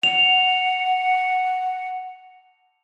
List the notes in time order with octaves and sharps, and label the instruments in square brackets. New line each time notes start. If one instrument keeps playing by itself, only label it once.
[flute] F#5 [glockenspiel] F7